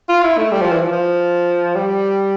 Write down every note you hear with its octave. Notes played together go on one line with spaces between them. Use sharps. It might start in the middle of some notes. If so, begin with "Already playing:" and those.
F4
E4
A3
G3
F3
E3
F3
F3
G3